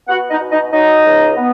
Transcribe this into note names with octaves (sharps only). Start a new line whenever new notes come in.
B3 F#4 F#5
D#4 D#5
B2
D#4 D#5
F#3 D#4 D#5
C#2
B3